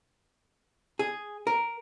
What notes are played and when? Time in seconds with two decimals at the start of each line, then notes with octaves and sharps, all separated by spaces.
0.99 G#4
1.47 A#4